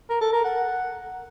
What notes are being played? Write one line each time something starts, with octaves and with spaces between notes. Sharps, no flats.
A#4
A4
A#4
F#5